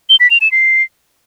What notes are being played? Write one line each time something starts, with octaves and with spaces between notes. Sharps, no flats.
G7
B6
F7
E7
C7